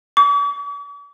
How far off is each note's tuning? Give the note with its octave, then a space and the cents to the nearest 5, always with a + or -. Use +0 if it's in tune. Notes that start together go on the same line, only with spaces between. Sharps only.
D6 -45